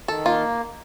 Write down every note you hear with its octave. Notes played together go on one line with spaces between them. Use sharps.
D#3 A4
A#3 F4